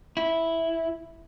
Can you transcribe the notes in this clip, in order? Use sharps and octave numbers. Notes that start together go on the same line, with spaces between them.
E4